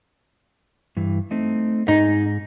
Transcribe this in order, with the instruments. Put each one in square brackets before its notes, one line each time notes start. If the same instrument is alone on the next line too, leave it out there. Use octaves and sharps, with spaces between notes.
[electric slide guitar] G2 E3
A3 C4 D#4
[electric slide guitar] G#2 G#4 [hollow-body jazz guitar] D#4